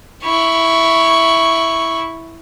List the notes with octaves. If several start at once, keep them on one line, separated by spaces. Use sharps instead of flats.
E4 C#6